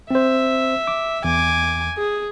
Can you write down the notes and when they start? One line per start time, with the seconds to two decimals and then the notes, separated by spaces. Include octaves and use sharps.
0.11 C4 C5 E5
0.87 D6
1.24 E2 G#5 D6
1.98 G#4